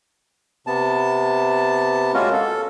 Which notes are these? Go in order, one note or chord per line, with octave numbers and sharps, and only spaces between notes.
C3 B3 A5
G#3 A#3 C#4 F4 F#4
A4